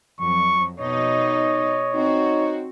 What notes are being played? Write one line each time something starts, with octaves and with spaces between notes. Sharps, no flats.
F2 F#3 C#6
B2 D#4 C#5 D#5
C4 D#4 F#4